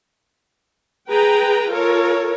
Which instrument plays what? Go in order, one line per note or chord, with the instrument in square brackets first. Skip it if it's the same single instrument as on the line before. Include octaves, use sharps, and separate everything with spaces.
[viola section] G#4 B4 G5 A#5
F4 A4 A#4 C#5